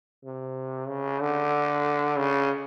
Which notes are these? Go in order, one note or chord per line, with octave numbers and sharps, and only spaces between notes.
C3
C#3
D3
C#3